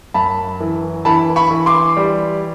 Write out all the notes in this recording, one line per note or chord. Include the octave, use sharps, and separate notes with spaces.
F#2 A5 B5
E3
E3 A5 B5
B5 C#6
E3
C6 D6
G3